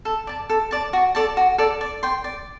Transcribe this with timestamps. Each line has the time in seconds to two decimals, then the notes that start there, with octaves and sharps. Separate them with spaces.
0.05 A4
0.27 D5 A5
0.50 A4
0.71 D5 A5
0.93 F#4
1.15 A4 D5 A5
1.37 F#4
1.58 A4 D5 A5
1.81 D5
2.03 G5 C6
2.24 D5